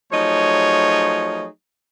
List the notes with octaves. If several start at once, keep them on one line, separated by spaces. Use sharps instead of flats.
F3 F#3 A3 D#4 G#4 C#5